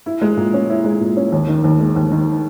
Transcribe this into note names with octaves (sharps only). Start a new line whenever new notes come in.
E4
G#3
A#2
C#4
E4
G#3
A#2
C#4
D#2
D#3
D#2
G#3
D#2
D#3